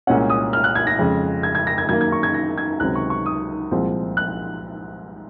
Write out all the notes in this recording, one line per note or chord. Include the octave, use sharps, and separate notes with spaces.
C2 A#2 G#3 C#4 F#5
D#6
F6
F#6
G#6
A#6
F2 C#3 G#3
G#6
G#6
A#6
G#6
F#2 D#3 A#3 G#6
G#6
C#6
G#6
A#6
G#6
C#2 C3 D#3 F#3 C4 F#6
C#6
C#6
D#6
C2 A#2 F3 G#3 C4
F#6